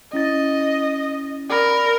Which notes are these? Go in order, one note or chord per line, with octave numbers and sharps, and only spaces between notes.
C#4 E4 D#5 A6
A#4 D5 B5